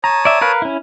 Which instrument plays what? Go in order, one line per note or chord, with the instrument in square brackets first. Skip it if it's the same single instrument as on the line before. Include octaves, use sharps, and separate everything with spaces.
[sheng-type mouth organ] C#5 A5 D#6 [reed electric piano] A#5
[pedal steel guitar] D5 E5
A#4 B4 F5
C#4 E4